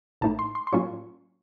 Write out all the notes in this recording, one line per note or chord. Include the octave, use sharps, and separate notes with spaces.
A1 A2 A3 D#4 A5
C6
C6
C6
A2 F#3 A#3 C#4 F4 C#6